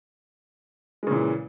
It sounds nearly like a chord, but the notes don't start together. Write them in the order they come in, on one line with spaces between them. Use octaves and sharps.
G#3 C#3 A#2 E3